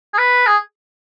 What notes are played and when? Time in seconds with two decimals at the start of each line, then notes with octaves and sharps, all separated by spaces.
0.14 G#4
0.18 B4
0.47 G#4